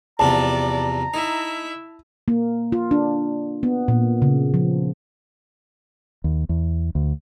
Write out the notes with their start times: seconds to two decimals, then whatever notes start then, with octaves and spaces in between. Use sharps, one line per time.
0.19 E2 C3 F3 D5 A5 A#5
1.14 D#4 E4 E5
2.28 A#3
2.72 F4
2.91 D4
3.63 B3
3.88 A#2
4.22 C#3
4.54 F3
6.24 D#2
6.49 E2
6.95 D2